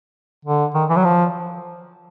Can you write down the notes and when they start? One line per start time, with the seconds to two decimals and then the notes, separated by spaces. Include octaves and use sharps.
0.45 D3
0.74 D#3
0.89 E3
0.97 F#3
1.04 F3